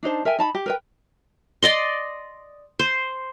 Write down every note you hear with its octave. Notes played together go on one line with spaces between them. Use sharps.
D4 D#4 C5 A5
A#4 E5 G5 G#5
D#4 A5 B5
G4
A#4 B4 G5
D5 D#5 C6
C5